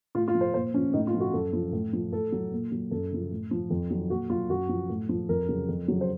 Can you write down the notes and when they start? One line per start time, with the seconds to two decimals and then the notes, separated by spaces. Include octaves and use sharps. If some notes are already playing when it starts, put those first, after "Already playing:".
0.15 A2 F4
0.28 F4
0.35 F3
0.41 C5
0.54 A#2 C5
0.74 F3 C#4
0.93 A2 D#4
1.07 F4
1.14 F3
1.20 F#4
1.33 F#2 A4
1.53 F3
1.72 A2
1.93 F3
2.12 A2 A4
2.32 F#3
2.52 A#2
2.71 F#3
2.91 F#2 A4
3.11 C#3 F3
3.31 A2
3.51 F3
3.70 F2
3.90 D#3 F#3
4.10 A#2 F#4
4.29 F#3 F4
4.50 F#2 F#4
4.69 F3
4.89 A2
5.09 F3
5.29 F2 A#4
5.48 C#3 F#3
5.69 F2
5.88 C#3 F#3
6.01 C5